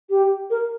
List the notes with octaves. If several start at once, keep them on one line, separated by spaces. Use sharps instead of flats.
G4
A#4